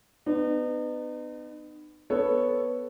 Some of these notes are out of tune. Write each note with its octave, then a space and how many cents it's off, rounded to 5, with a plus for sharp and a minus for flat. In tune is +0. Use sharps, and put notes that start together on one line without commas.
B3 +25 D#4 -40
B3 +0 A4 +0 C#5 +0